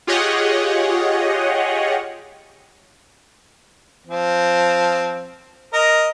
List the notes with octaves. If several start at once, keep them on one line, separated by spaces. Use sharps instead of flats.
F4 G4 G#4 C#5 D#5 F#5
F3 C4
A#4 D#5